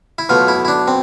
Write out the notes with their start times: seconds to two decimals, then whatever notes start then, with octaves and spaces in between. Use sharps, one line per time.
0.18 E4
0.29 B1 B2 A3 F4
0.48 E4
0.65 E4
0.68 D4
0.88 C4